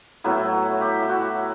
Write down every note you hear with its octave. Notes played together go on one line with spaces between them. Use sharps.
A2 F#3 B3 E4
F#4
G4
E4
F#4